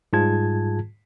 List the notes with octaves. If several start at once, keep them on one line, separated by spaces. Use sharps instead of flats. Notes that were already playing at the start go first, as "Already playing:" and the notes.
G#2 G3 F4 G#4 A5 G#6